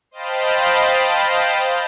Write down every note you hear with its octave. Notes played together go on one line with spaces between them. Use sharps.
C5 D#5 F5 G5 A5 B5